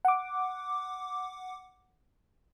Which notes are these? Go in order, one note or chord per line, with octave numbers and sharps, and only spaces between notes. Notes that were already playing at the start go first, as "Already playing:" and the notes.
F#5 D6